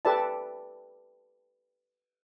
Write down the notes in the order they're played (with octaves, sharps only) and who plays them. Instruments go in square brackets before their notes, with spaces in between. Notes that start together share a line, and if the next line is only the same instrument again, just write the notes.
[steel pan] G4 A4 B4 D5 E5 A5